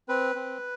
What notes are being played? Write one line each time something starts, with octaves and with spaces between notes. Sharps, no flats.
C4 B4
C4